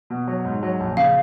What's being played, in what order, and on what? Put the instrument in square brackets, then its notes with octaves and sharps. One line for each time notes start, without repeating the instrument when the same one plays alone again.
[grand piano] B2
F#3
G#2
F#3
A#1
[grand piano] C#3 [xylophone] F5